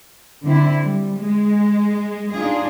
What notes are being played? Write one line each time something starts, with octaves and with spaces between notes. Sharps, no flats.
D3 C4 E4
G3
G#3
D4 D#4 F4 G#4